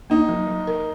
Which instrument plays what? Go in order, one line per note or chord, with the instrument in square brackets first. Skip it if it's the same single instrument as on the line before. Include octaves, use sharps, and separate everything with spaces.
[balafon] A#3 [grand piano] D#4
[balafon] F#3
F#3
A#4